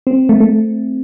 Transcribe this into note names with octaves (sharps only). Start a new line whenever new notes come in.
C4
A3
A3